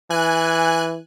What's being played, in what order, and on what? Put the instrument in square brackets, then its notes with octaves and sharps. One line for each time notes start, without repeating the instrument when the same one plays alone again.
[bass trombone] E3 [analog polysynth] G#5 F#6